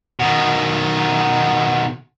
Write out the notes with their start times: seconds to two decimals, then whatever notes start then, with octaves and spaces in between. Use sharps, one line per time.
0.20 B2 D#3